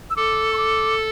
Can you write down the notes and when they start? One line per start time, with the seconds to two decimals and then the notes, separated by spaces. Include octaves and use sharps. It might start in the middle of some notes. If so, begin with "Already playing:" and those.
0.10 E6
0.16 A4 D6
0.53 C#6
0.58 D6